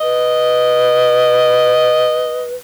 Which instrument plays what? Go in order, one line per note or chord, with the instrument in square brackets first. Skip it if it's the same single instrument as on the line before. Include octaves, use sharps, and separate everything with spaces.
[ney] B4 [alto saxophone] D#5